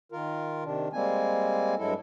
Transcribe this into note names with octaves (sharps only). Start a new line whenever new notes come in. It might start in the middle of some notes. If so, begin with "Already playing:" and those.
D#3 F4 A#4
C3 D#3 D4
G3 G#3 A#3 C4 G#5
G2 F#3 G#3 E4 A4